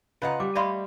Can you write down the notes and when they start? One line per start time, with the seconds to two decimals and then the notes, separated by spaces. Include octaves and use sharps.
0.22 C#3 F4 B4 D#5 F#5 A#5
0.40 G3 D6
0.55 A3 D5 D#5 F5 B5 C6